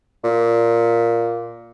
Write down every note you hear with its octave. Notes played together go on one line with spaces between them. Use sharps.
A#2